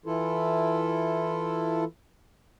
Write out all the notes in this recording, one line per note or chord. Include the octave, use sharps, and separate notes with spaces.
E3 E4 F4 A4